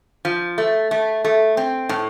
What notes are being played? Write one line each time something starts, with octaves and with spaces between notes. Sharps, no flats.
F3
A3
A3
A3
C4
A2